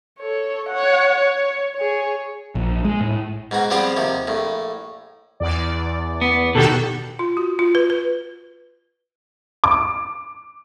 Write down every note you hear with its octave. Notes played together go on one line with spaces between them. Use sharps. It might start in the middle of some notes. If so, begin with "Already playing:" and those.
A4 C#5
C#5 F#5
C#5
G#4 C#5
A#1
G#3
A2
G#2 B2 F#4
F3 G3 B3 C4 G4 G#4
D#2 C3 F3
A#1 A2
E2 D5
B3
B2 D#3 F#4 G4 A4
F4
F#4
F4
B4
B4
D6